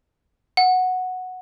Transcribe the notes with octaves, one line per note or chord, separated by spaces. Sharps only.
F#5